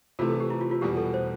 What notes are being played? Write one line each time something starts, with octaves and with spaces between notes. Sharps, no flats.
C3 E3 A3 F4
A4
G4
E4
F4
F4
E2 B2 G3 G4
A4
C5